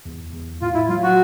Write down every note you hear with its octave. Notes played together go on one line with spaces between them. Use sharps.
E2
E2
A2 F4
E4
F#3 F4
F#4